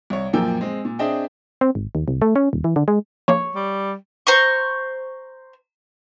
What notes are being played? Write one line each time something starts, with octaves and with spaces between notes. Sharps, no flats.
C2 C#5
F#2 A#2 F3 A#3 G5 E6
G#3 C4
A#2
C4 D4 G#4 D#5 E5 G5
C4
G#1
D#2
C2
A3
C#4
D#1
E3
D3
G#3
F3 A#3 C#5
G3
C5 A#5 C#6